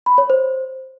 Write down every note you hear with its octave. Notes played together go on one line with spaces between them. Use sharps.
B5
C#5
C5